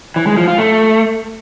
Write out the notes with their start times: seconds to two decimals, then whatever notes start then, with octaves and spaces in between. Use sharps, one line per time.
0.16 E3
0.27 G#3
0.37 F3
0.48 F4
0.58 A3